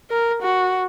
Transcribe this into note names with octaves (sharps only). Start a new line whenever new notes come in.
A#4
F#4